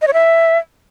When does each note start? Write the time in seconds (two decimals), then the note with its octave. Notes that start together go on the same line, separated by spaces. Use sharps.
0.02 D#5
0.08 C#5
0.13 E5